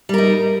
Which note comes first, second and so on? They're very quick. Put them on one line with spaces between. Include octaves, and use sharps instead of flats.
G3 A#4 D#4